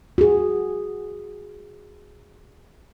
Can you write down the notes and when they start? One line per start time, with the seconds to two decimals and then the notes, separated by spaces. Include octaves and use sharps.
0.18 F#4 G#4